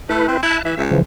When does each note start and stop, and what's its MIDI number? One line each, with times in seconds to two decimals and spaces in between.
0.09 0.25 57
0.09 0.37 64
0.09 0.37 71
0.28 0.41 60
0.43 0.57 64
0.43 0.62 76
0.43 0.62 81
0.43 0.62 90
0.65 0.75 52
0.65 0.82 76
0.77 0.98 37
0.91 1.02 49
0.91 1.02 52
0.91 1.02 53